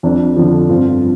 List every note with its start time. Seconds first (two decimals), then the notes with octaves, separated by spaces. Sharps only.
0.03 F2 D4
0.36 D3 F3
0.69 G2 C4 F4